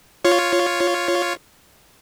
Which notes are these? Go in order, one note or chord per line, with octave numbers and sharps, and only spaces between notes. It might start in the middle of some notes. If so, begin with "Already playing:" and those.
F4 C#5